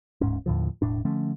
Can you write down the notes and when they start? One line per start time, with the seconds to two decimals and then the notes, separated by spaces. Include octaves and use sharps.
0.21 D1 G#2 C#4
0.46 D#2 A2 D3 F3
0.82 E1 A2 D4
1.05 D3 F3 A3 C#4